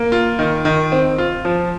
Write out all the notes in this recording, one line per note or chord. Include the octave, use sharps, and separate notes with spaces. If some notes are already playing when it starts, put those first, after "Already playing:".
Already playing: A#3
F4
D#3
D#3
C4
F4
F3